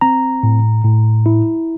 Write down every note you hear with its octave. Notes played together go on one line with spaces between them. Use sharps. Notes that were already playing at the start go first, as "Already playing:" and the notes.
C4 A#5
A2
A2
E4